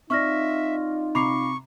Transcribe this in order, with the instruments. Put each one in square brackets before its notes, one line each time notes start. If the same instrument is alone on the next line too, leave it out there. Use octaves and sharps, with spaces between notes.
[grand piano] C4 D5 [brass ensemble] D#4 F4 [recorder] E5 [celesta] C#6 F6 A#6
[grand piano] C3 A#5 F7 [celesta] B5 D6 C7 [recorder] C#6